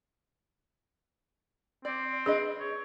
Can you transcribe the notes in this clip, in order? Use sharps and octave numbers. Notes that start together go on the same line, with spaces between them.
C4 D5
D4 G#4 B4 D#5
C#5